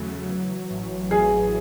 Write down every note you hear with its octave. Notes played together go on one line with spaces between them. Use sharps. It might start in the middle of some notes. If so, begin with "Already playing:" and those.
Already playing: E2 C#3 F#3 A3
E3
A1
E3 G#4